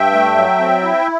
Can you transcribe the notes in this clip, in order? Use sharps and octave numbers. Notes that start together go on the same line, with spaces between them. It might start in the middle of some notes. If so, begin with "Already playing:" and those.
Already playing: G2 E5 G5
A3
F#3
C4
E4